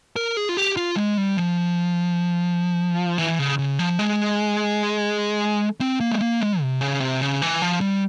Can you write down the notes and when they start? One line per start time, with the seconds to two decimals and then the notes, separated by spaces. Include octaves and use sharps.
0.16 A#4
0.37 G#4
0.49 F4
0.57 G4
0.77 F4
0.96 G#3
1.17 G3
1.37 F3
3.18 E3
3.39 C#3
3.58 C#3
3.79 F3
3.99 G#3
5.81 C4
6.00 A#3
6.11 G#3
6.21 A#3
6.40 G#3
6.61 C3
6.81 C#3
7.00 C3
7.21 C#3
7.42 E3
7.62 F3
7.81 G3